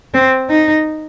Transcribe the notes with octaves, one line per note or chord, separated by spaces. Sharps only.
C4
D#4